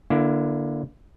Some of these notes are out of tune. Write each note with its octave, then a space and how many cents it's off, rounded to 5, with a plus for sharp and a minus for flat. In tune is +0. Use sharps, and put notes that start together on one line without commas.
D3 +0 A#3 +25 E4 +30